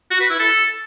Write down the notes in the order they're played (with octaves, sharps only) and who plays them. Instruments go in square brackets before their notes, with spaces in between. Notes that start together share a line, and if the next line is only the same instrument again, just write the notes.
[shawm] F#4
B4
E4
A4